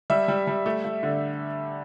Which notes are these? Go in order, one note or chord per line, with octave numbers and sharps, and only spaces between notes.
G3 E5
G3
G3
A3 E5
A3
D3